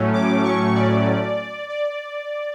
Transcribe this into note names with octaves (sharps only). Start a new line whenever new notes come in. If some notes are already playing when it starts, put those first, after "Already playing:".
Already playing: A2 F#3 A3 C#4
D6
C#6
D5
D5